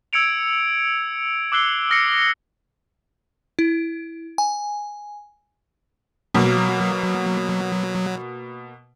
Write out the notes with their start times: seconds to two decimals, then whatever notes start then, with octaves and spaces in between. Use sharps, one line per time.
0.13 E6 G#6 C#7 D7 F7
1.52 D6 E6 F#6 C7 G7
1.90 D#6 F6 A#6 C7 C#7
3.59 E4
4.38 G#5
6.34 B2 F#3 A#3